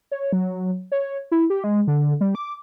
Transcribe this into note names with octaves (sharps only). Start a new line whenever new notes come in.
C#5
F#3
C#5
E4
G4
G#3
D3
G3
D6